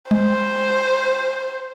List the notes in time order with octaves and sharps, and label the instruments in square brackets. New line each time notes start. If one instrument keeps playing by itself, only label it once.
[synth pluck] G#3 [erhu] C5